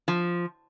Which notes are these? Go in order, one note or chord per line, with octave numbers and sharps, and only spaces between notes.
F3